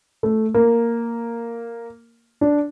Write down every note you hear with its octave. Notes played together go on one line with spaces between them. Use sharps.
A3
A#3
D4